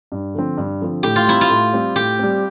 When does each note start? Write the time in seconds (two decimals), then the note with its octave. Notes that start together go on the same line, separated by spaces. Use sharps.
0.12 G2
0.34 D3 F3 C4
0.57 G2
0.81 D3 F3 C4
1.03 A2 G4
1.16 F4
1.27 G3 C4 E4
1.41 F4
1.49 A2
1.73 G3 C4
1.96 A2 G4
2.19 G3 C4